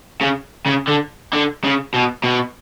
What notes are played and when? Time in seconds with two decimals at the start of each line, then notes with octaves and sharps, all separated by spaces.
0.21 C#3
0.66 C#3
0.88 D3
1.33 D3
1.64 C#3
1.94 B2
2.24 B2